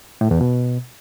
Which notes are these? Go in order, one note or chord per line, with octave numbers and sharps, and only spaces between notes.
A2
E2
B2